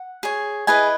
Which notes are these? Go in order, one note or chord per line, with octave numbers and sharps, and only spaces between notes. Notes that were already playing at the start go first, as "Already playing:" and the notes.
Already playing: F#5
G#4 C#5
E4 G#4 B4 D#5 G#5